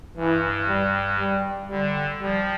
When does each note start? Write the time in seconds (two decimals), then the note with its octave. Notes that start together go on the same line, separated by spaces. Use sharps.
0.16 G2 E3
0.67 G3
1.19 G3
1.69 D3 G3
2.21 F3 G3